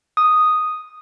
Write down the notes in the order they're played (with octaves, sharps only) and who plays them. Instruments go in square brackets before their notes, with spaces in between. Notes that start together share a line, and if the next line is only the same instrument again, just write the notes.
[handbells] D#6